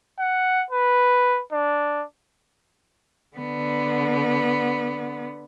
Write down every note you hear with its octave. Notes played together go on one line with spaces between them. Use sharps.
F#5
B4
D4
D3 B3